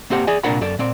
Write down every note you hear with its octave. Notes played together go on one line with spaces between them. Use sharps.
A#3 C4 G4 F#5
G#4 D5 G#5
C2 A#2 D4 A#4 F#5 B5
F#2 A4 D5
A#2 C4 D5